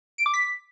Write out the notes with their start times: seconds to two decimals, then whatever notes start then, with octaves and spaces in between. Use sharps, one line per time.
0.18 D7
0.26 D6
0.34 B6